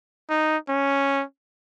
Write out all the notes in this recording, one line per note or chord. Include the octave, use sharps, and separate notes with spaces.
D#4
C#4